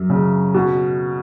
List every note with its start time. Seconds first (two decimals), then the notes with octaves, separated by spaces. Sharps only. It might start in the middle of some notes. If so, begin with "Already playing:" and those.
Already playing: F#2
0.10 C#3
0.54 B2